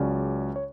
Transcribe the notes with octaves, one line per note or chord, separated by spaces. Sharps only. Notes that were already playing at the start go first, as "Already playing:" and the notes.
Already playing: C#2 C#3 F#3 C#4 D5
C#5